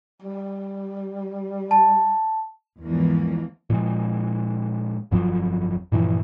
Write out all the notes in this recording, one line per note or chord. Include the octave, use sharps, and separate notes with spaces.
G3
A5
E2 G#2 E3 F3 A#3
A#2 F3 G#3
G1 F2 F3 F#3
G2 A#2 E3 F3